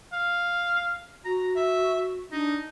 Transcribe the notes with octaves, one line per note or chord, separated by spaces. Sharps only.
F5
F#4 A#5
E5
D4 D#4